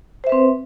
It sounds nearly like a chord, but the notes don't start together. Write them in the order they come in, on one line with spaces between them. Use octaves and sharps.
C5 E5 B4 C4